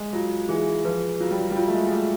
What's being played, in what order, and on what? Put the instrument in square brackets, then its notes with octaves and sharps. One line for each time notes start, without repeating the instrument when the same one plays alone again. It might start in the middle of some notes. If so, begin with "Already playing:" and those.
Already playing: [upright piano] G#3
[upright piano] F#3 [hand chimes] F4
[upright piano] E3 [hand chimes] G#4
[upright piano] F3 [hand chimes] B4
[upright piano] F#3 [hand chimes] F4
[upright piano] G3
F#3
G3
[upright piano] F#3 [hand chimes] F4
[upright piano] A3
G#3
G#3
[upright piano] A3 [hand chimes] G#4